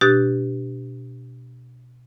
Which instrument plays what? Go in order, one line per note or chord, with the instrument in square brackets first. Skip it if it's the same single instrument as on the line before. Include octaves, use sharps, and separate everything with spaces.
[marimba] B2 D4 G4 F#6 A6